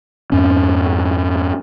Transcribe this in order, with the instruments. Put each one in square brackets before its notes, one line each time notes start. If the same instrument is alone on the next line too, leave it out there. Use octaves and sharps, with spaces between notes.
[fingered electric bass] F2 G#2 C#4